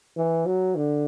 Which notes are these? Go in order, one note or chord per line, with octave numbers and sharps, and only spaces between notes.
E3
F#3
D3